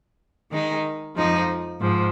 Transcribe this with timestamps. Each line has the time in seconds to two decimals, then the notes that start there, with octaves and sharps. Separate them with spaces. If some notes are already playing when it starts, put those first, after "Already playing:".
0.50 D#3 G#3 D#4
1.15 F2 F3 G#3 D#4
1.79 G#2 F3